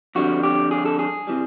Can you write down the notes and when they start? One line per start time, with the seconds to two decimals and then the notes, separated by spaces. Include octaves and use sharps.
0.15 F2 D3 G3 F#4
0.43 G4
0.71 G#4
0.86 A4
0.99 G#4
1.27 C3 E3 G3